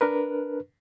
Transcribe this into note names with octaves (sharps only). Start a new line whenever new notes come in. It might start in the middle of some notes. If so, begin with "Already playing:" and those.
D4 A#4 B4